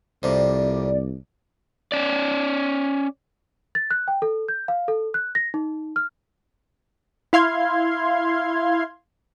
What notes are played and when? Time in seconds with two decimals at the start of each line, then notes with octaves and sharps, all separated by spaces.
0.23 C2 F2 C3 D5
1.92 C#4 D5
3.75 A6
3.91 F#6
4.08 G5
4.22 A4
4.48 G6
4.68 F5
4.88 A4
5.14 F#6
5.35 A#6
5.54 D#4
5.96 F6
7.33 E4 F5 C6 G#6